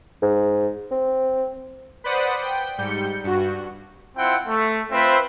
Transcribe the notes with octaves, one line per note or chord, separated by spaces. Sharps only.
G#2
C4
B4 C5 D5 F#5 B5 D#6
G5
G#2 G3 G6 C#7
G2 F#4
C4 E4 F4 F#5 G5
A3
C4 F4 B4 C5 E5